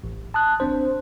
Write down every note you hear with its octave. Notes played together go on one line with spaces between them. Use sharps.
A1
A5 D#6 F#6
A1 C4 D4 C5